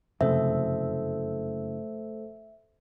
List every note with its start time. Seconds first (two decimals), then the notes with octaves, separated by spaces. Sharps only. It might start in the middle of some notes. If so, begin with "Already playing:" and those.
0.21 F#1 F2 C3 A3 A4 C5 E5